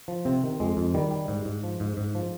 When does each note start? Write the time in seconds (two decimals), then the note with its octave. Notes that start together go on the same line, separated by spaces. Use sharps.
0.08 F3
0.25 C3 C4
0.44 D#3
0.60 F2 G#3
0.77 F2
0.94 D#3 G3
1.11 G3
1.28 G#2
1.45 G#2
1.64 F3
1.80 G#2
1.97 G#2
2.15 F3